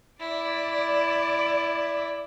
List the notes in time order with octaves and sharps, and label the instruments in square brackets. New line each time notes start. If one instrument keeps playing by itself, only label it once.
[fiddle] E4 [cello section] D5